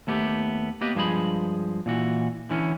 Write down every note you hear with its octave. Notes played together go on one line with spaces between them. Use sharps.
D#2 A3 B3 G4
A#3 B3 G4 B4 D#5
G2 F3 G#3 G#4 B5
A#2 E3 F#4
D3 E3 C#4